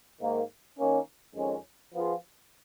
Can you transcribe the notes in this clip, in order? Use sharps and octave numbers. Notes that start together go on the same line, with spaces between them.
G#2 D#3 A#3
D#3 A#3 C#4
F2 D#3 G#3 C#4
F3 B3 F4 G#4